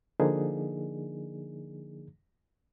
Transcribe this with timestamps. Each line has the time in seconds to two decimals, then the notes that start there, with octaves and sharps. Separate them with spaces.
0.20 D3 F3 A#3 D4 D#4 G#4